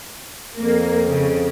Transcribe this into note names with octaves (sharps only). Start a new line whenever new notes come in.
F2 A#3
C#3